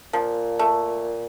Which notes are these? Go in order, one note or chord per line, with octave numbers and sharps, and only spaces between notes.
A#2 F3
A3